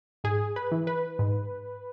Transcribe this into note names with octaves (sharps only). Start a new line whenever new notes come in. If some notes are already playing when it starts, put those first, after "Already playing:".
G#2 G#4
B4
E3
B4
G#2